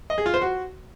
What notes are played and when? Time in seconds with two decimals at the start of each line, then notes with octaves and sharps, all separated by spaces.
0.10 D#5
0.18 G#4
0.26 F4
0.34 C5
0.42 F#4